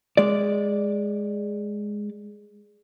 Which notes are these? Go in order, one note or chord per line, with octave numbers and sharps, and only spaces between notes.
G#3 D5